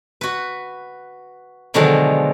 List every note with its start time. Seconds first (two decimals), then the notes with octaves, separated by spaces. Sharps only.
0.21 F#4 B4
1.74 B2 D3 D#3 F3 F#3 G#3